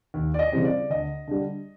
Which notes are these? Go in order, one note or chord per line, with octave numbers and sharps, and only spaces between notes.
D#2
D5
D#5
C#3 E3 G3 C4
D5
D2 D#5
D3 G3